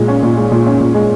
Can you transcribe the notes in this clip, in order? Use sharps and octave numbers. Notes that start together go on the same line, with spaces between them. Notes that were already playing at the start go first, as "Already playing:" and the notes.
Already playing: A#2 G#3
C#4
A#2
G#3
A#2
C#4
A#2
G#3